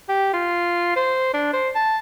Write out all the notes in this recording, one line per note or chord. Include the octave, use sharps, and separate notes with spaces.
G4
F4
C5
D4
C5
A5